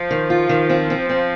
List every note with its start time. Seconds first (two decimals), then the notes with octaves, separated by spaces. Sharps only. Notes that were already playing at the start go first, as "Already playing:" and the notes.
Already playing: F3
0.11 D#3
0.30 F4
0.49 D#3
0.69 C4
0.90 C4
1.09 C4